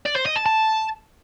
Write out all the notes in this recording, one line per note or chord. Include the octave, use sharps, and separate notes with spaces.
D5
C5
D#5
A5
A5